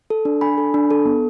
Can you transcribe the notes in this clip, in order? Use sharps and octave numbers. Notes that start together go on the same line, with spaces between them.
A4
D4
D4 G#5 B5
A4
D4
A4
B3